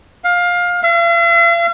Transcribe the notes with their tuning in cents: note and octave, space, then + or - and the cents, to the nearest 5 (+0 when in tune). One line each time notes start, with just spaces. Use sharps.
F5 +20
F5 -45